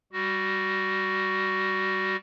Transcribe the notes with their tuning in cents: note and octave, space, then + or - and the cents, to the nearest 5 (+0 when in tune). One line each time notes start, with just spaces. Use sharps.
G3 +0 F#4 +15